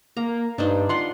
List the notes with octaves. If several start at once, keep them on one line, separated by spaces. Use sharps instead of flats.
A#3 A#5
G2 D4 D#4 C5
F4 F#5 C6